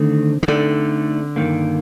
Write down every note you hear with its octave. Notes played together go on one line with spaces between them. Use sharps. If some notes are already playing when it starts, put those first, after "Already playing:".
Already playing: D3 D#3 A3 C4
D#3
D3 A3 C4 D#4 A4 D5
G2 D#3 A#3